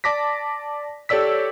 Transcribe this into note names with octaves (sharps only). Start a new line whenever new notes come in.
D5 A5 D6 A#6 B6
G4 A4 C#5 D5 E6 B6